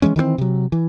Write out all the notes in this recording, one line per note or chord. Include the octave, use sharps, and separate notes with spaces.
E3 F3 G#3 C#4
D#3 E3 G3 C4
C3 F#3
E3